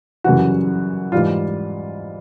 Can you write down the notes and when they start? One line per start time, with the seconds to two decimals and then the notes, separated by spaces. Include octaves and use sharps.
0.24 F#2 C#3 E3 G3 F#4
1.12 G#2 E3 G3 F4